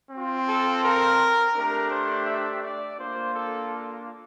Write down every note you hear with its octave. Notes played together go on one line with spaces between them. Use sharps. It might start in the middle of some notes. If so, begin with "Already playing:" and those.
C4 F4
A4
A#4
A3 D4 G4 A#4
C5
E5
D5
A#3 D4 F4 C5
A4